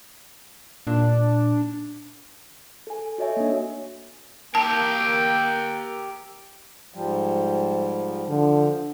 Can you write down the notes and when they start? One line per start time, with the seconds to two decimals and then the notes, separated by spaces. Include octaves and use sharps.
0.87 A#2 D4
2.87 A4 G#5
3.18 F#4 A4 C#5 D#5 E5 G#5
3.37 A#3 D4
4.55 A#3 G4 A#4 G5 A5
6.94 G#2 F3 G3
8.29 D3 F3